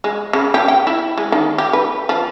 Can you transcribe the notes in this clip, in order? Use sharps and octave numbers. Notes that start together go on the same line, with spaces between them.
G#3
C#3
G4
G5
E4
G#3
D#3
G4
B4
F3